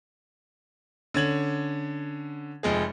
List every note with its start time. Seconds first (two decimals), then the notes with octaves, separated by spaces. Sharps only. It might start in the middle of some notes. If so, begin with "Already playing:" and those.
1.14 D3 C#4 G#6 F#7
2.63 F1 F2 G#3 G#4